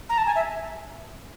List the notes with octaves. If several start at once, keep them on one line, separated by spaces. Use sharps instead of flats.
A#5
A5
G#5
E5